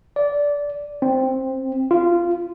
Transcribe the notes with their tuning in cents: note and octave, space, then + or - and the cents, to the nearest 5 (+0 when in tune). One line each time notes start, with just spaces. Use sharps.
D5 -15
C4 +5
F4 -15